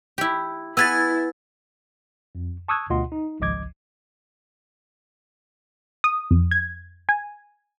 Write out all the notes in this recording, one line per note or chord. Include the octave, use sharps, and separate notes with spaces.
E4 G4
B3 E4 G#4 B4 E6 G#6 A6
F2
A5 C#6 D#6 E6 F#6 G#6
D2 B2 F4 D#5 F#5 C6
D#4
G#1 C#2 F3 D#5 D6 G#6
D#6
F2
G#6
G#5